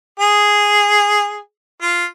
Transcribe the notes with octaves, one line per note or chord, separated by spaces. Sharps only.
G#4
F4